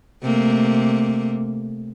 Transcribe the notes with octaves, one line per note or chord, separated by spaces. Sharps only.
C3 A3 A#3